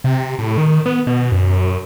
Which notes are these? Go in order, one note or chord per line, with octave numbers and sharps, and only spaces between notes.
C3
A2
D#3
B3
B2
F#2